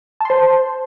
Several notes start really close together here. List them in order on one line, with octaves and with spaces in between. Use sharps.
A5 C6 C5